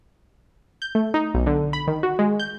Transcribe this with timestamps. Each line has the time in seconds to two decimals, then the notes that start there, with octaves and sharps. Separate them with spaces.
0.82 G6
0.95 A3
1.14 D#4
1.34 B1
1.46 D3
1.73 B5
1.87 D#3
2.03 F#4
2.19 G#3
2.40 G6